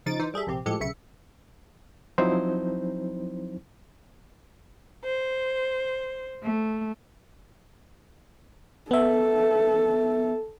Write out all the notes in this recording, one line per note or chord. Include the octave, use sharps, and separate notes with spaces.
C#3 F3 D#4 A6 D7
E3 D#4 C5
G3 G#4 A4 E5
A#1 C3 C4 G4
A2 F3 G#3 G4 A4 C#7
B1 C#3 E5 C#7
F3 F#3 C4 D#4 E4 C5
C5
A3
B3 A4 E5